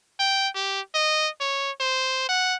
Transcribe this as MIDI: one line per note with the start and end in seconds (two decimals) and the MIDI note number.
0.20 0.48 79
0.55 0.80 67
0.95 1.28 75
1.40 1.71 73
1.80 2.27 72
2.29 2.55 78